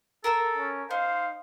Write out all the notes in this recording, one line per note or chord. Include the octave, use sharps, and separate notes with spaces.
A4 A#4 A#5 E6
C#4
D#4 C5 F5